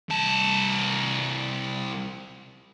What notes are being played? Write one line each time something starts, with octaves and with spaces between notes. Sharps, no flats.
C2 A5